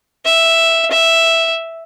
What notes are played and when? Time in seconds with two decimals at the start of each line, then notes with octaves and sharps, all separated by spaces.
0.25 E5
0.91 E5